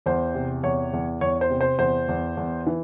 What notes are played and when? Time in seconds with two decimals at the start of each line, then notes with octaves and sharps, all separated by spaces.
0.06 E2 C5
0.35 C3
0.63 E2 C#5
0.93 E2
1.21 E2 C#5
1.41 C5
1.50 C3
1.61 C5
1.79 E2 C5
2.08 E2
2.37 E2
2.67 E3